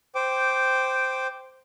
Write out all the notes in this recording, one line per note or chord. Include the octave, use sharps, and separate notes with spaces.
C5 G5 D6